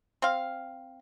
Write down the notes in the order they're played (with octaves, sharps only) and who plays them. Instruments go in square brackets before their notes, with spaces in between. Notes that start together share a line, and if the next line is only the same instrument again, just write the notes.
[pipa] C4 F5